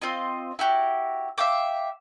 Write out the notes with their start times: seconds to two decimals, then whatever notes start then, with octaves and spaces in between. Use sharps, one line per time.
0.02 C4 F4 D#5
0.59 E4 F#4 G4
1.38 E5 F5 G5 D6